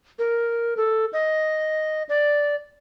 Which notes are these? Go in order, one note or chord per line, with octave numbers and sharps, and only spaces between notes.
A#4
A4
D#5
D5